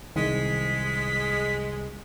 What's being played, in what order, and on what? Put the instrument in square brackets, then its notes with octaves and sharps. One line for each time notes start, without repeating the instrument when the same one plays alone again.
[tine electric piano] C2 [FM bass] D#3 [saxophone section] G#3 [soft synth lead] B6